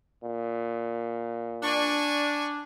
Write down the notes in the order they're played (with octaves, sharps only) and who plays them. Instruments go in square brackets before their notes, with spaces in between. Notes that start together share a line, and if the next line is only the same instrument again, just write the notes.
[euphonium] A#2
[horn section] D4 [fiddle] G#5 C#6